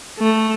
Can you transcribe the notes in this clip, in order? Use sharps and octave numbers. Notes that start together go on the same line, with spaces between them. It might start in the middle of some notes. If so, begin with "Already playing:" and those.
A3